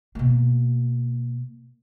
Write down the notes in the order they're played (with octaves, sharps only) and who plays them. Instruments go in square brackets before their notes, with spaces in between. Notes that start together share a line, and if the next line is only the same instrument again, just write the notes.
[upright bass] B2 A#3